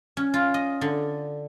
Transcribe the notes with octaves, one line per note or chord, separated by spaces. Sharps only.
C#4
F4
D#5
D3